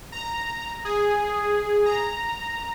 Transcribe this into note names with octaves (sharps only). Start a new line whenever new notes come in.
A#5
G#4
A#5